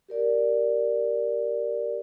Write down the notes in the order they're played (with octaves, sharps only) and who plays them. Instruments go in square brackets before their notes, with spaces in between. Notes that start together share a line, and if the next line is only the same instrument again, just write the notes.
[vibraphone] G4 A#4 D5